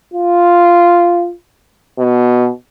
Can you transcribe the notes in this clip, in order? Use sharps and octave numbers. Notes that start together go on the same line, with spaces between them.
F4
B2